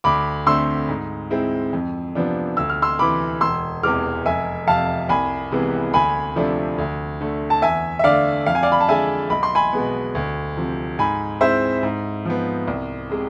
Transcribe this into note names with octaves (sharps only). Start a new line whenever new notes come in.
D2 B5 D6
D3 A3 C4 C6 E6
G#2
G#3 C4 E4
F2
C3 F3 B3 D4
D2 E6
F6
C6 E6
C3 E3 B5 D6
E1 C6 E6
E2 C3 E3 G#3 D6 F6
F1 E5 G#5
F2 C3 F5 A5
C2 G#5 B5
C3 E3 G#3 B3
D2 G#5 B5
C3 F3 A3 D4
D2
D3 A3
A5
E2 E5 G#5
E5
D3 A3 D5 F5
F2 F5
G#5
D5 F5
B5
A5
D3 G#3 E5 G#5
B1 B5
C6
G#5 B5
B2 G#3 B3
D2
C3 F3
G#2 G#5 B5
G#3 C4 E4 C5 E5
G#2
F3 B3
C2
C3 G#3